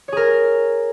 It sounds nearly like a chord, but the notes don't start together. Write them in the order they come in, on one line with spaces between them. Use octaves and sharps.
C#5 G#4 A#4